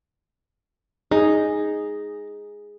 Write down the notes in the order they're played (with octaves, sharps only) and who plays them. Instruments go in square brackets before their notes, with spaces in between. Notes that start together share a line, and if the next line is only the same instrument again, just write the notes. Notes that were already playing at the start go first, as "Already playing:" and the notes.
[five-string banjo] D#4 [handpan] G#4